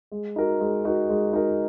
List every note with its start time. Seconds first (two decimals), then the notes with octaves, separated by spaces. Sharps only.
0.12 G#3
0.36 D#4 F#4 A#4
0.60 G#3
0.85 D#4 F#4 A#4
1.09 G#3
1.33 D#4 F#4 A#4